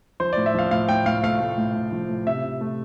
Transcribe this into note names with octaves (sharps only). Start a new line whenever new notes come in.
F3 C5
A2 D5
E5
F3 F5
A2 F5
A2 G5
A2 F5
A3 F5
A3
A2
A2
F3
A2
C3 E5
C3
A3